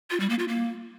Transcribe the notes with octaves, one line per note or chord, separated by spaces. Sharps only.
F4
G3
A#3
F4
A#3